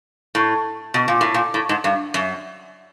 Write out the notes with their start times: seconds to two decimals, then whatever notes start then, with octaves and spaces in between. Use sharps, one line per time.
0.35 A2
0.94 B2
1.08 A#2
1.21 A2
1.34 A#2
1.54 A2
1.69 G#2
1.84 G2
2.14 F#2